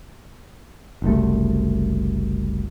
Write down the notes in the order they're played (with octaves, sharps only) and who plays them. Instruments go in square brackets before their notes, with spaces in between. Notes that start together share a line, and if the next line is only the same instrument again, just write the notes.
[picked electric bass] F#1 C2 A3